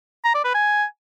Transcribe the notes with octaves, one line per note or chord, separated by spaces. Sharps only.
A#5
D5
B4
G#5